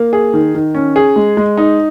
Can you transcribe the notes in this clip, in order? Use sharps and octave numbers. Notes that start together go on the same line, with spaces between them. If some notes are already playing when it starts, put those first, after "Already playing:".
Already playing: A#3
G#4
D#3
D#3
C#4
G#4
G#3
G#3
D#4